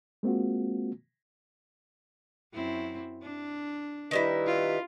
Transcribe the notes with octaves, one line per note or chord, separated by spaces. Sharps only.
G#3 A#3 C4 F4 F#4
F#2 C4 E4
D4
D#3 G3 E4 B4
F4